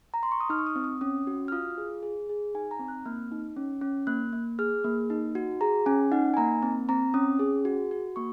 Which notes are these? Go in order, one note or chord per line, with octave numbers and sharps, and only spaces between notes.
A#5
C6
C#6
D#6
D#4 F6
C#6
D#6
C4
D#6
C#4 D#6
F#4
F6
F4 D#6
G#4
G#4
G#4
D#4 G#5
A#5
C4
F#6
A#3 F6
D#4
C#4
C#4
A#3 F#6
A#3
G#4 F6
A#3
D#4
F#4
G#4 A#5
C#4 G#5
D#4 F#5
G#5
A#3 A#5
C4
C4 A#5
C#4 D#6
G#4
F#4
F#4
A#3 C#6